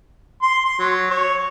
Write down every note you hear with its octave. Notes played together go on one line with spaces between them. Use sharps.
C6
C6
F#3
C#5